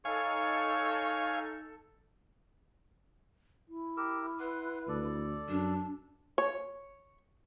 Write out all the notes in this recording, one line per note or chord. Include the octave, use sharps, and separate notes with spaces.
D#4 A4 C#5 F5 G#5
E4
G4 A#4 E6
B4 F#5 C6
D2 A4 D5
F#2 D4
C#5